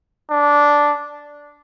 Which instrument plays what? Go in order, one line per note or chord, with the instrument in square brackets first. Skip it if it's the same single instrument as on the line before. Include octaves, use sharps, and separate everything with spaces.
[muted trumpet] D4